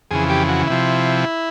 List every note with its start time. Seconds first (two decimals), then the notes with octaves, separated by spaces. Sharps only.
0.11 F2 C#3 E3 G#4
0.30 G4
0.49 F#4
0.68 C3 F3 E4